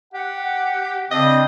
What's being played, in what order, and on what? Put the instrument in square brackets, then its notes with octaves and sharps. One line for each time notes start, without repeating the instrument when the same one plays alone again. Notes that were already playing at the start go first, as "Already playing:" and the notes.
[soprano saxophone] G4 [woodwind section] F#5
[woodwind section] C#3 C4 D4 [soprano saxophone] D#5